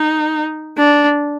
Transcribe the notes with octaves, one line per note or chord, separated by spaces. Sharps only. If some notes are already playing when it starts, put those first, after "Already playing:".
Already playing: D#4
D4